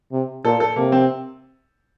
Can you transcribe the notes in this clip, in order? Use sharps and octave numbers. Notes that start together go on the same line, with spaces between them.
C3
A#2 A4
A4
C3 A#3
C4